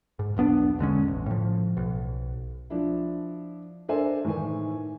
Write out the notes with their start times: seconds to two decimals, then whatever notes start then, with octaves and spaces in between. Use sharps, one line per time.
0.19 G#2
0.37 E1 B1 B3 D4
0.79 E1 D3 G#3 C#4
1.08 A1
1.26 A2 F3
1.77 B1
2.70 F3 D4 E4
3.89 D4 A4 A#4 C5 E5 G#5
4.24 A2 D#3 E3 G#5